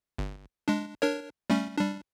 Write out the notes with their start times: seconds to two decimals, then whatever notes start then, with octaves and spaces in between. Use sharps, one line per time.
0.18 G1
0.68 G#3 D4
1.02 D4 A#4 C#5
1.50 G3 A3 C#4
1.78 G3 D4